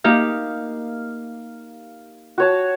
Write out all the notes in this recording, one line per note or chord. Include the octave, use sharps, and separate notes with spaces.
A#3 D#4 G4 F5
F#4 C#5 A5